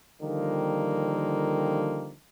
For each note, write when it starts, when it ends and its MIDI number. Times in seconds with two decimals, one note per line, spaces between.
0.22 2.14 50
0.22 2.14 51
0.22 2.14 53
0.22 2.14 55
0.22 2.14 58